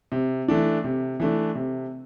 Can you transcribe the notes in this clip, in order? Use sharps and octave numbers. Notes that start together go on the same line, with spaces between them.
C3
E3 A3 D4
C3
E3 A3 D4
C3